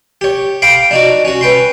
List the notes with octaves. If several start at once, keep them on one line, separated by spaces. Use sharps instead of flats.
G4 C#5
F5 G5 B5 C6 D6
D4 D#4 F#4
C#4 F#4
C#4 B4 G5 C6